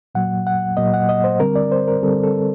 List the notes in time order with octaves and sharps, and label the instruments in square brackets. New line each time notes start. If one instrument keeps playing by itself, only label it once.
[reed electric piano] A#2 F#3 A#3 F#5
F#5
A#2 F#3 A#3 D#5
F#5
D#5
C5
D3 G3 C4 A#4
D5
C5
A#4
D3 G3 C4 A4
A4